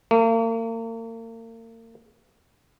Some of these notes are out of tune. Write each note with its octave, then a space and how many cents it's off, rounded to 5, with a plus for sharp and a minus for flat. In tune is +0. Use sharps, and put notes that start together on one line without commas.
A#3 -40